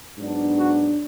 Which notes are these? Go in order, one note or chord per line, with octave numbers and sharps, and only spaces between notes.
G#2 F#3 B3 D4
F#4